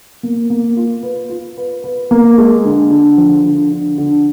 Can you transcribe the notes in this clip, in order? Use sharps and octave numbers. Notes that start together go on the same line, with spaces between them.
A#3
A#3
F4
B4
F4
B4
B4
A#3
G#3
D3
D3
F3
D3
D3
D3